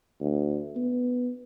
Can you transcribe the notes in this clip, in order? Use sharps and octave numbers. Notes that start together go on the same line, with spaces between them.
D2
B3